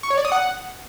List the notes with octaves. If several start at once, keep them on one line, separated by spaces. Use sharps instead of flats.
C#6
C#5
D5
D#6
F#5